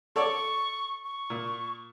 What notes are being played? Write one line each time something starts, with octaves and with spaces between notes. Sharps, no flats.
A4 C#5 D5 C#6
C#6
A#2